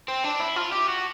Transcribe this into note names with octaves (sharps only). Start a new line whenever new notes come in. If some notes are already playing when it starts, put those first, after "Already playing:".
C4
D4
E4
F4
G4
F#4